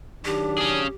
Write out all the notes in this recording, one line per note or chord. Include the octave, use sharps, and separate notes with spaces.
D#3 F#3 D4 G4
C#4 G#4